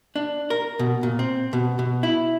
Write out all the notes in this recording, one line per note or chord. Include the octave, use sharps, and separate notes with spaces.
D4
A#4
B2
A#2
C4
B2
B2
E4